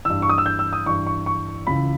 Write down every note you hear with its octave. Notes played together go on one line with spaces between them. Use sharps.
G2 E3 E6
C#6
D#6
E6
G6
E6
D#6
G2 E3 C#6
C#6
C#6
C#2 C#3 E3 B5